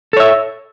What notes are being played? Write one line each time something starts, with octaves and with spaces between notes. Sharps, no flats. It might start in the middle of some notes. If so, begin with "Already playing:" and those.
A4 C#5 E5